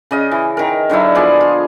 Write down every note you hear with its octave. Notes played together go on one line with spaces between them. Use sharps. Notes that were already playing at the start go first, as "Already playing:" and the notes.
C#3 D#5 F5
E3
D#3 A#4
D3 F#3 D#4 E4
F3 B3 G#4 D5
F4